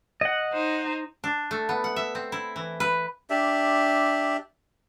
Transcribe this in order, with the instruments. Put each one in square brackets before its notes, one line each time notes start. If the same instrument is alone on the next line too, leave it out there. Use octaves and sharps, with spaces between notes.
[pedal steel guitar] D#5 F#5
[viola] D#4 C5
[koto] D4
A3
B3
F#5
E5
C4
E4
E3
B4
[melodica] D4 G4 E5